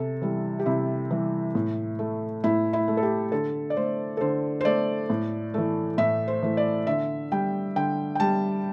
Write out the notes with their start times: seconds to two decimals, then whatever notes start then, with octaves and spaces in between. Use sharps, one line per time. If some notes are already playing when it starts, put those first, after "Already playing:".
Already playing: C3 A4
0.22 E3 G3
0.59 G4
0.66 C3 E4
1.10 E3 G3
1.55 A2
1.99 A3
2.44 A2 E4
2.73 E4
2.88 A3
2.97 A4
3.03 G4
3.32 D3 A4
3.70 D5
3.77 A3 C5
4.17 A4
4.21 D3 C5
4.61 C5
4.65 A3 D5
5.10 A2
5.54 E3 A3
5.98 A2 E5
6.28 C5
6.43 E3 A3
6.57 D5
6.87 D3 E5
7.32 G3 G5
7.76 D3 G5
8.15 G5
8.20 G3 A5